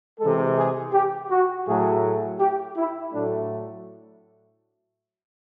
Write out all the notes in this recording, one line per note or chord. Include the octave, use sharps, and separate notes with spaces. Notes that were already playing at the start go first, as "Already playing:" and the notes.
C3 E3 G#3 A4
G#4
G4
F#4
A2 F#3 A3 G#4
G4
E4
A2 F#3 A3 D4